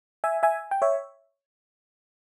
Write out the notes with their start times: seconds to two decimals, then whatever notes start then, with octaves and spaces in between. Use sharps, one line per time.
0.24 E5 G#5
0.43 E5 G#5
0.71 G5
0.82 C#5 E5